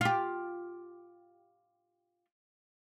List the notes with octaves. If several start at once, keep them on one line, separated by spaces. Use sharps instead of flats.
F4 G4